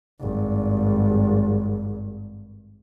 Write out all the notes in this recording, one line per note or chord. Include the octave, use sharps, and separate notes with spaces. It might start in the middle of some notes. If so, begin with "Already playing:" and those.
G#1 G2